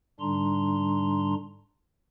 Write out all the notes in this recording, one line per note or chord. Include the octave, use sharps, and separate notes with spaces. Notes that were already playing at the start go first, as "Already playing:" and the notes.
G#2 D3 G3 D4 A#5 C6